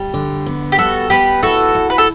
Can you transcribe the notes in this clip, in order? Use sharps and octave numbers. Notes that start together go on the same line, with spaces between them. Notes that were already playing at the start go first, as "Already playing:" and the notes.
Already playing: G3
D3
B3
G4
G3 F#4 A4
B3 G4 B4
E4 F#4 A4
E4
B4
A4